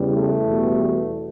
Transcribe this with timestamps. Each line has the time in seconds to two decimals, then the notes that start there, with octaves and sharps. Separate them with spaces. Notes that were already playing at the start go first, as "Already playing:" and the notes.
Already playing: E2 C#3 E3 G3
0.16 A3
0.49 E2 B2 G3